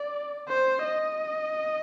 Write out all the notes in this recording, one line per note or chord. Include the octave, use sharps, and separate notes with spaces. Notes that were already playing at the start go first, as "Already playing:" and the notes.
Already playing: D5
C5
D#5